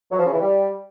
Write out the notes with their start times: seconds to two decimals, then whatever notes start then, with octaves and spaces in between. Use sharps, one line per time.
0.12 F#3
0.19 F3
0.26 C#3
0.33 E3
0.40 G3